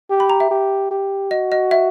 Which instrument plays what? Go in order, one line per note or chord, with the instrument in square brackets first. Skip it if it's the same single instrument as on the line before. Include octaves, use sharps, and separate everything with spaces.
[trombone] G4
[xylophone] B5
A#5
E5
[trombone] G4
G4
[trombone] F#4 [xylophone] D#5
[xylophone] D#5
E5